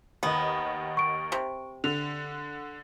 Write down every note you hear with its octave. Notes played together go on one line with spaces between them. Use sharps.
D#2 D#3 B3 D#5
C#6 D7
C3
D3 F7